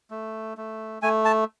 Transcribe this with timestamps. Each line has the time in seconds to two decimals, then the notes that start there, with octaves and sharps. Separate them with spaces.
0.11 A3
0.57 A3
1.02 A3 G#5
1.25 A5